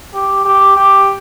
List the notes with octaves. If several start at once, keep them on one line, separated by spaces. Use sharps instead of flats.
G4
G4
G4